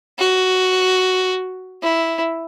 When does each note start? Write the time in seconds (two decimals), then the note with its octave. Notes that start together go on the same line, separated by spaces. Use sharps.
0.19 F#4
1.82 E4